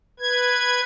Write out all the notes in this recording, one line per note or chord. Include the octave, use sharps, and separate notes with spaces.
B4 G#6